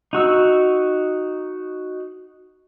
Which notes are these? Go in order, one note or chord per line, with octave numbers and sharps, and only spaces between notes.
D#4 F#4 E6